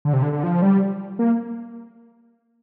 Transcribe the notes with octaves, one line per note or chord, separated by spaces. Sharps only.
D3
C3
D3
D3
F3
G3
A#3